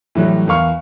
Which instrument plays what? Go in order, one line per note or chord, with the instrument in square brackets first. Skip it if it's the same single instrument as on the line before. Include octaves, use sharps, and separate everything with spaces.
[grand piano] A2 E3 F#3 G3
E2 A#4 F5 C#6 F6